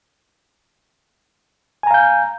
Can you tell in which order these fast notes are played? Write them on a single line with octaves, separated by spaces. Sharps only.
G#5 A#5 F5 G6